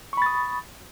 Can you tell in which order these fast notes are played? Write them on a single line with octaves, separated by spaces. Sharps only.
C#6 B5 A6 D#6